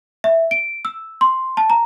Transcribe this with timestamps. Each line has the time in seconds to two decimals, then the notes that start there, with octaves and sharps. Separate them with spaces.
0.24 E5
0.51 D7
0.85 E6
1.21 C6
1.57 A5
1.70 A#5